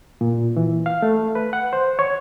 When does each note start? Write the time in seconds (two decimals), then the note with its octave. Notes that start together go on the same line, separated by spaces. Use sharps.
0.21 A#2
0.56 E3
0.86 F5
1.02 A3
1.35 B4
1.53 F#5
1.73 C5
1.99 C#5